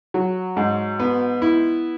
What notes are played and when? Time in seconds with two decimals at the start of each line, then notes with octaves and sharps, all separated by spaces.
0.14 F#3
0.57 G#2
0.99 B3
1.42 E4